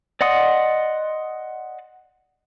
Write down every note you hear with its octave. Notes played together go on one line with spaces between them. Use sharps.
D5 D#5 F#5 C6 D#6